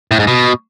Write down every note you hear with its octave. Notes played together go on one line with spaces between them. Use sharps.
A2
G#2
B2